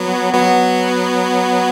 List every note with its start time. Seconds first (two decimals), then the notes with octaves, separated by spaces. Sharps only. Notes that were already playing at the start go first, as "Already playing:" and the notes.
Already playing: F#3 B3
0.34 F#3 B3